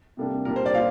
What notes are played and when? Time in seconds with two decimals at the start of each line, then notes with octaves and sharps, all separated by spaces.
0.17 C3 G3 A#3 D4
0.45 A#2 G3 D4 A#4
0.56 C5
0.66 D5
0.74 A#2 F5